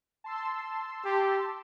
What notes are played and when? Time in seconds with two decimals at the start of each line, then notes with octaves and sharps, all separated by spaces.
0.24 A5 C6 E6
1.05 G4